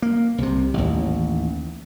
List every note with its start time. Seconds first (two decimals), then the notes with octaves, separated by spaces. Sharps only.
0.02 A#3
0.38 C2 C3
0.74 A1 D#2